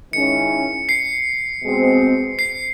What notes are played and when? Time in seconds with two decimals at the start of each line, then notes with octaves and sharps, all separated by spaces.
0.13 D#3 G#3 C#4 E4 C#7
0.89 C7
1.63 B2 G#3 C4
2.39 C7